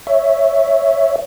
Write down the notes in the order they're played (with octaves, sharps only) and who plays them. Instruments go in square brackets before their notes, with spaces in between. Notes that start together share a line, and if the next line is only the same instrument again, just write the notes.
[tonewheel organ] C#5 E5